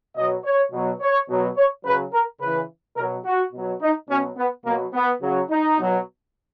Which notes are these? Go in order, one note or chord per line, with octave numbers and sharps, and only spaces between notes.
B2 F#3 D#5
C#5
B2 F#3
C#5
B2 F#3
C#5
C#3 F#3 B4
A#4
C#3 E3 B4
B2 F#3 A#4
F#4
B2 F#3
D#4
B2 F#3 C#4
B3
B2 F#3 A#3
B3
C#3 F#3
D#4
B2 F#3